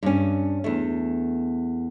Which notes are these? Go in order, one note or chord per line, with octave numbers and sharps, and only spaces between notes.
G2 C#4
E2 A3